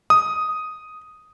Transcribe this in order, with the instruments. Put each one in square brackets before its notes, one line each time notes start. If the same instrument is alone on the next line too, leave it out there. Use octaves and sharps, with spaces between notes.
[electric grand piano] D#6